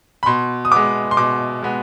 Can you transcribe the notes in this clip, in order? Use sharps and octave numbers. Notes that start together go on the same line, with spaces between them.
B5
B2 C6
D#6
G#3 B3 D6
C6
B2 D6
G#3 B3